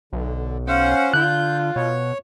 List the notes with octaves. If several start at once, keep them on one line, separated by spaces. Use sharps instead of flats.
B1 D3
C#4 C5 F5 F#5
D3 F4 F#6 G6
B2 C#5